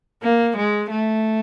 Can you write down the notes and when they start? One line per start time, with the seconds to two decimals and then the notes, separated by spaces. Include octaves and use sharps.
0.23 A#3
0.57 G#3
0.90 A3